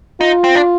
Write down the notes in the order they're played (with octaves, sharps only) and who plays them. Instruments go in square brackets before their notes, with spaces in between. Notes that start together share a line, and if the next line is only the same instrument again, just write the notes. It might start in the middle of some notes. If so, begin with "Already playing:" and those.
[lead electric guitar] D#4 [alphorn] F4
[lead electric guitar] C4
D4